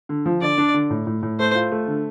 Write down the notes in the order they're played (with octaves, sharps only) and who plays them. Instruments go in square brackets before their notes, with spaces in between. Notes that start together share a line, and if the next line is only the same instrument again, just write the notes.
[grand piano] D3
F3
[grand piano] D3 [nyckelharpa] D5
[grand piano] D4
D3
A2
A2
A2
[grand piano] A3 [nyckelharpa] C5
[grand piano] F4
A3
D3